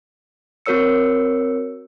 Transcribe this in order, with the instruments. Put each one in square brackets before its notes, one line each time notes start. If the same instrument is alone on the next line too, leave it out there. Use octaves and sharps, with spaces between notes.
[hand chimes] C4 F#4 A#4 C#5 E6 C#7